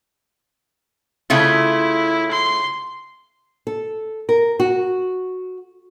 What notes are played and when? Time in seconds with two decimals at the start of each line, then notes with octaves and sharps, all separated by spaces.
1.30 C#3 A3 E4 F4
2.31 C6
3.67 A4
4.29 A#4
4.60 F#4